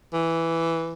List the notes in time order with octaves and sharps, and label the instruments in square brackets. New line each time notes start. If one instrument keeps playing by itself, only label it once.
[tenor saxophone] E3